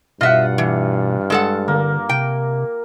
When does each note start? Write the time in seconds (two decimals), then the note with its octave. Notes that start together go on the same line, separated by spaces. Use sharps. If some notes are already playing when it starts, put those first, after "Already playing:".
0.21 G2 B2 F4 D#5 E5 F#5
0.58 E3
1.30 G#3 A4 F#5
1.68 D3 A#3
2.09 C3 G5